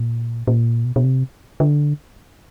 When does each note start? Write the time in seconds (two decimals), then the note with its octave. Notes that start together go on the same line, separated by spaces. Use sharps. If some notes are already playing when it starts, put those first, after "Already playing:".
Already playing: A#2
0.47 A#2
0.85 B2
0.96 B2
1.04 C3
1.60 D3